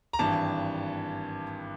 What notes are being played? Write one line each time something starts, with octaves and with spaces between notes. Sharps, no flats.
A#5
G#1 G2 E3 A5